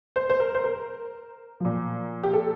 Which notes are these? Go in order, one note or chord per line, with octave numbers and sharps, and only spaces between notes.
C5
C5
A#4
C5
A#4
A#2 F3
G4
A4